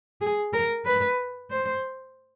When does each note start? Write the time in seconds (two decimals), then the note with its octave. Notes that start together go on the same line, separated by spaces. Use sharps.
0.21 G#4
0.54 A#4
0.86 B4
1.51 C5